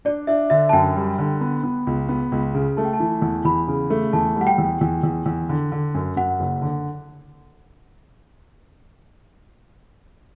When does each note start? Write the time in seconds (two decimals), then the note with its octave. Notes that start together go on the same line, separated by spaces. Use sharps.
0.05 D4 D5
0.27 D4 E5
0.50 D3 E5
0.69 A5
0.73 F#2 G5
0.96 G3
1.18 D3
1.41 B3
1.63 B3
1.87 C#2
2.09 B3
2.32 C#2
2.55 C#3
2.77 A3 A5
2.85 G5
2.93 A5
3.00 E3
3.22 E2
3.45 E2 B5
3.68 C#3
3.90 A3
4.13 E2 A5
4.36 G3 F#5
4.47 G5
4.58 E2
4.81 E2
5.03 E2
5.26 E2
5.49 D3
5.72 D3
5.95 F#2
6.16 F#2 F#5
6.40 F#1
6.62 D3